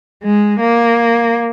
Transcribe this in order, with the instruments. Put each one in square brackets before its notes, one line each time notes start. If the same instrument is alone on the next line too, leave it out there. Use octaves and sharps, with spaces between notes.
[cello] G#3
A#3